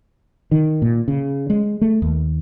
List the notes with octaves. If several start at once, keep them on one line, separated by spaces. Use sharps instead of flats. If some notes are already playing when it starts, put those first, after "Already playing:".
D#3
A#2
C#3
G#3
A3
D#2